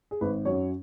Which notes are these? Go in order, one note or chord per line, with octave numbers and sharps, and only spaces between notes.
G#4
G#1 B4
F#2 F#3 C#5